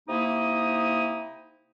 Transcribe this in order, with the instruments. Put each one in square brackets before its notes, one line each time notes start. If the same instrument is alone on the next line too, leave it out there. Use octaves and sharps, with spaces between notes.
[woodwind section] C3 A#3 D#4 E4 D#6